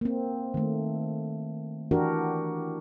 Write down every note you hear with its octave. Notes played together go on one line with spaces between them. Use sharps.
A#3 C4
D#3 A3
E3 D4 F#4 G4 A#4